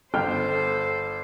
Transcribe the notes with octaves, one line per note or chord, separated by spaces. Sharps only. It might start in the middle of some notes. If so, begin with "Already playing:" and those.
G1 A4 C5 G5 F6